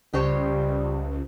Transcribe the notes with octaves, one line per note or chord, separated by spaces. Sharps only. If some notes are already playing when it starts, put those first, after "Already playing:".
C#2 G3 G4 C5 C#5